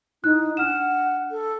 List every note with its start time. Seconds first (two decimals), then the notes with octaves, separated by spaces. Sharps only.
0.24 D#4 E4 F#6
0.57 D4 F#5 F6 E7
1.31 A4